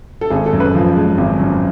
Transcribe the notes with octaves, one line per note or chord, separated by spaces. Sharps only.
A4
G#1 G#4
A4
F#2
B4
F3
G#3
G#1
F#2